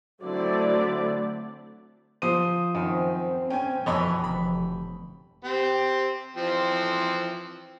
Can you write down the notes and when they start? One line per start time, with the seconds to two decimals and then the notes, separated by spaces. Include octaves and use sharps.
0.23 D3 F#3 A3 C4 E4 D5
2.22 F3 C5 D#6 D#7
2.75 F#2 D#3 C4
3.50 C#4 G5 G#5
3.86 F2 B2 D3 E3 C#5 D#5 B5
4.24 F1 B5
5.44 C4 G4
6.37 E3 F3 C4